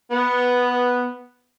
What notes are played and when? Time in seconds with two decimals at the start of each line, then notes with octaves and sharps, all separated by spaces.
0.11 B3